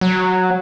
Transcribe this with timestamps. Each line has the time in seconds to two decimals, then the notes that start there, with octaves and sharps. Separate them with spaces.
0.01 F#3